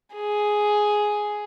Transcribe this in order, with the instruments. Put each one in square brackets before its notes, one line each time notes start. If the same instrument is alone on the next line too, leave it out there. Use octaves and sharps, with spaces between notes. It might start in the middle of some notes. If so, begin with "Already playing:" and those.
[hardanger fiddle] G#4